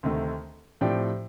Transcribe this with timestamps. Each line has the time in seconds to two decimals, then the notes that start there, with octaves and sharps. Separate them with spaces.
0.03 D2 C3 D#3 A3 C4
0.81 A2 F3 C4 G4 D5